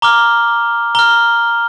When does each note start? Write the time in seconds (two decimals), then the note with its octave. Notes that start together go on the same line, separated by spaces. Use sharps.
0.02 A#5 D6 F6 G7
0.95 A#5 F6 G7